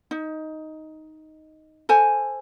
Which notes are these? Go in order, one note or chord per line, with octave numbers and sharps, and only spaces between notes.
D#4
A4 C5 G#5